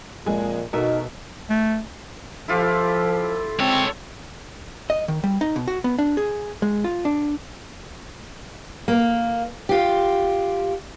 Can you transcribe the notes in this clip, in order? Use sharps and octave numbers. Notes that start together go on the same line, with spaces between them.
F2 A#2 G#3 G#5
B2 D#4 F#4 A4 A#4 E5
A3
F3 E4 F4 G4 A4
G#3 C4 A4 C#5
D#5
D#3
G3
D#4
B2
F#4
B3
D4
G#4
G#3
F4
D4
A#3
F4 G4